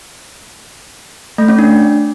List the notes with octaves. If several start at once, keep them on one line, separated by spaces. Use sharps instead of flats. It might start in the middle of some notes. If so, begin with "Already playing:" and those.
A3
C#4
D4